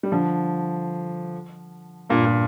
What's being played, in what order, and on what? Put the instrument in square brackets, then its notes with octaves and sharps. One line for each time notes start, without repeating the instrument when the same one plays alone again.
[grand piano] G3
D3 F3
G2 A#2
A#2